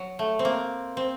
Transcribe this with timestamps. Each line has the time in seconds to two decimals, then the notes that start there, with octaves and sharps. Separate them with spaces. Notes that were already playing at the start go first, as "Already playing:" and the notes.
Already playing: F#3
0.19 A3
0.39 C4
0.45 A#3
0.97 C4